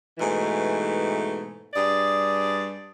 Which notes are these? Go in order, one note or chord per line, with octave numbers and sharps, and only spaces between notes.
G#2 B2 E3 A3
G2 G#4 D5